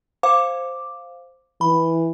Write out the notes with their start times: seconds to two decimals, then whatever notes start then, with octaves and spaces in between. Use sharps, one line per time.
0.23 C5 F5 D6
1.61 E3 B5